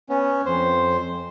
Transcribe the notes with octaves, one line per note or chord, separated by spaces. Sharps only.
B3 C#4
F2 C5